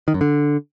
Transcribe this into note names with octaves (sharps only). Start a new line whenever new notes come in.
D#3
F#2
D3